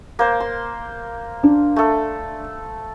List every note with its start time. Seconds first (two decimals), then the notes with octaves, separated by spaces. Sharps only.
0.19 A#3 C5
0.40 C6
1.43 D4
1.76 A3 A4